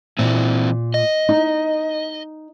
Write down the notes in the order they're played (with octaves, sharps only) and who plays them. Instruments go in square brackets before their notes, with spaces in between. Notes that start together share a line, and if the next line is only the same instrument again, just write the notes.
[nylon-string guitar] A#2 [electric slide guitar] E3 C4 E4
[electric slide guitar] D#5
[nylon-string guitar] D#4